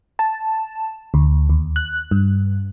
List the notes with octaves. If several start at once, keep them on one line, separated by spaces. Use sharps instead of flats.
A5
D2
D#2
F#6
G2